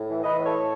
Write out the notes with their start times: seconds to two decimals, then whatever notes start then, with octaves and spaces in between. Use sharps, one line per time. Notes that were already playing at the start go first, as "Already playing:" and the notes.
Already playing: A2
0.09 E3
0.24 E3 B4 D#5
0.38 A2
0.46 A4 C#5
0.53 A2